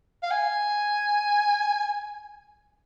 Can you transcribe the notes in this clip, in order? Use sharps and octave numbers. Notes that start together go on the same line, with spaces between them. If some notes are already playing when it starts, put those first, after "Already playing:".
F5
G#5